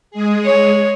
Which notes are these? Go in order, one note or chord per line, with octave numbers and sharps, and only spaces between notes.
G#3 G#4
C#5